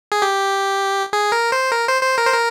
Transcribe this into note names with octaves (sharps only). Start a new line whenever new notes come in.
G#4
G4
G#4
A#4
C5
A#4
C5
C5
A#4
C5
A#4